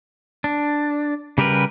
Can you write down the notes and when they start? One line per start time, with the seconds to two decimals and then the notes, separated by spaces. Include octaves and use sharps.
0.44 D4
1.38 C#3 G3 G4 A#4 B4